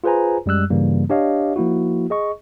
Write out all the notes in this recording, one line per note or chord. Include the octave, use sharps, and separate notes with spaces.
F4 G#4 B4 C5 G#5 A#5
F#2 G3 G#3 E6 F#6
G2 C#3 E3 G3 A#3
D4 G4 C#5 D#5 F5
F3 A#3 E4 F#4
G#4 D#5 C#6